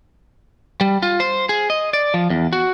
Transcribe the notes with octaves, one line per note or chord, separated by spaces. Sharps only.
G3
F4
C5
G#4
D#5
D5
F3
E2
F#4